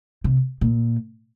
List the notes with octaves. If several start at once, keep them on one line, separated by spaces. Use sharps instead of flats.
C3
A#2